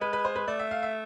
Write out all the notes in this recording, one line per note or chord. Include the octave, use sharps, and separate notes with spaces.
G#3 B4
B4
C5
B4
A3 D5
E5
F5
E5